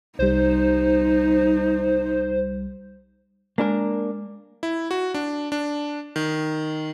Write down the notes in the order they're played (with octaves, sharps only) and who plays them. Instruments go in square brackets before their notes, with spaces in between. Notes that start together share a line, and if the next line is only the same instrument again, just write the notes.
[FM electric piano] C2 G3 [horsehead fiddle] D#4 [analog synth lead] C5
[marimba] G#3 [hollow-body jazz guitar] A#3 D4 A#4
[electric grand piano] E4
F#4
D4
D4
D#3